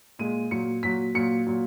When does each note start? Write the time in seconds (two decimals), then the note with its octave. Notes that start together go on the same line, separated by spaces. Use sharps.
0.19 A#2 G#3 D#7
0.51 A#2 F#3 C#7
0.83 A#2 F#3 B6
1.15 A#2 F#3 C#7
1.47 A#2 F#3